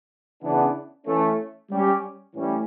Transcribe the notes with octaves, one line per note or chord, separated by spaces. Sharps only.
C#3 E3 B3 D4
E3 A3 C#4
G3 C#4 G4
A2 E3 G3 C#4